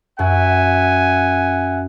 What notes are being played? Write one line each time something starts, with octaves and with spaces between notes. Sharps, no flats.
F#2 E5 F#5 G#5